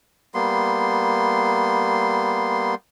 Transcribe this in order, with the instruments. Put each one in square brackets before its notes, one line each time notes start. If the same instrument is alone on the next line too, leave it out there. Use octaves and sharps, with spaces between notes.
[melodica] G3 A#3 B3 C6